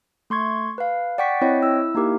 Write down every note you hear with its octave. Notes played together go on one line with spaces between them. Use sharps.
A3 C6 C#6 G#6
B4 F5
D5 F#5 G5 C#6 B6
C4 E4 C#5 D#5 G5
E4 E6
A#3 D#4 E4 G4 A#4